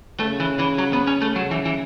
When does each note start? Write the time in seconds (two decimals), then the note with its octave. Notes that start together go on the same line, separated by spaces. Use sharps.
0.20 C#3 A3
0.40 E3
0.59 E3
0.78 F#3
0.93 B3
1.07 C#4
1.21 A3
1.36 C#3 F#3
1.51 E3
1.65 E3